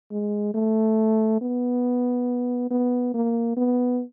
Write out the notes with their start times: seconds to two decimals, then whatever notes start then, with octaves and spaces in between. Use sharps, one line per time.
0.11 G#3
0.54 A3
1.41 B3
2.71 B3
3.14 A#3
3.57 B3